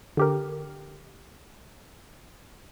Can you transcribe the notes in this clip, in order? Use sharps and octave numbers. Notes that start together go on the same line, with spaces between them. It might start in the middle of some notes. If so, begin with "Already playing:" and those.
D3 G4 A#4